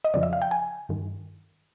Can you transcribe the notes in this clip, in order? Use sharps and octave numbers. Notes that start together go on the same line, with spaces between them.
D#5
F2 C#3 F3 D5
E5
F5
G5
G#5
G2 D#3